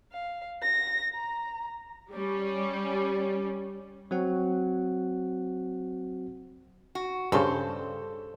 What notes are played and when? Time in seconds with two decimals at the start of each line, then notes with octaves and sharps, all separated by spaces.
0.12 F5
0.62 A#6
1.15 A#5
2.11 G3 C#4
4.11 F#3 C4 F#4 F#5
6.95 F#4
7.32 G2 C#3 A4 C5